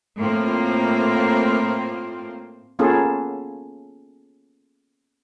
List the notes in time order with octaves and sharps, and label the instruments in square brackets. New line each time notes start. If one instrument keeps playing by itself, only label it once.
[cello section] A2 A#3 C4 F4 C5
[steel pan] A#3 B3 C#4 F4 G#4 A4